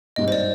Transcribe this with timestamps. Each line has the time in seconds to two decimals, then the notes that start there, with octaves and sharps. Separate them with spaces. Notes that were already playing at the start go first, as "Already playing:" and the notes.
0.16 G#1 G2 D#3 G3 D#5
0.28 C5
0.32 D5